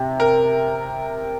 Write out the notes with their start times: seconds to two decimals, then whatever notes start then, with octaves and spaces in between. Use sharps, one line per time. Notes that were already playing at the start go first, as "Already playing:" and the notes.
Already playing: C3
0.20 A#4